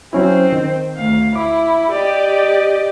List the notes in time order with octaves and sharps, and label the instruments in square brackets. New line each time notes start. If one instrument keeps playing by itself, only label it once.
[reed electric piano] F#3 C#4 E4 [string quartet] C4 C5
[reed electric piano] D#3
[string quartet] D2 F5
[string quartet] E4 [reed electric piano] D6
[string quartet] G4 D5 D#5